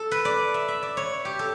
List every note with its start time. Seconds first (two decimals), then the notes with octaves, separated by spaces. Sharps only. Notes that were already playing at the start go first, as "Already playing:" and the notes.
Already playing: A4
0.11 B4
0.25 D5
0.54 E5
0.68 E5
0.82 D5
0.97 C#5
1.25 G4
1.39 A4